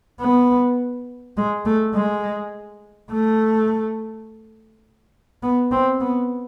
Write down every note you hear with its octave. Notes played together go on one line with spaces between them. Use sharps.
B3
G#3
A3
G#3
A3
B3
C4
B3